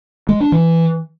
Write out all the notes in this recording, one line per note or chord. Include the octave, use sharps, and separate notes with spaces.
G#3
D4
E3